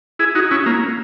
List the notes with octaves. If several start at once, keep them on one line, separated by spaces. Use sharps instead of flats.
E4 G#4
D#4 F#4
C#4 E4
A#3